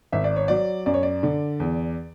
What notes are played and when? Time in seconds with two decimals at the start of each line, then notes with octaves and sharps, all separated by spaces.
0.12 G#1 E5
0.24 D5
0.36 C#5
0.48 F#3 D5
0.86 F#2 D5
0.94 C#5
1.03 D5
1.23 D3
1.60 E2